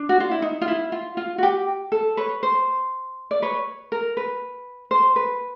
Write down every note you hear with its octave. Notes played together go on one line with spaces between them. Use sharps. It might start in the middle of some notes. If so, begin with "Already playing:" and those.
Already playing: D4
F#4
F4
E4
D#4
F4
E4
F4
F4
F#4
G4
A4
B4 C#5
C5
D5
B4 C#5
A#4
B4
C5
B4